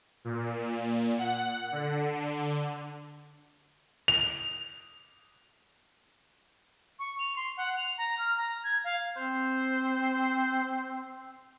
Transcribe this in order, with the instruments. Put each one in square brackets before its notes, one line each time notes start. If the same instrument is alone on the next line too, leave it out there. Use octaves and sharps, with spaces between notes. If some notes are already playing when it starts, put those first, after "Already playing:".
[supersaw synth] A#2
F#5
D3
[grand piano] F7
[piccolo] C#6
F7
C6
F#5
F7
A#5
F6
A#5
G#6
F5
[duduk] C4 [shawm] C5